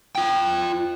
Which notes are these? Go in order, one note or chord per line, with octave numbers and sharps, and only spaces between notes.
F4 G5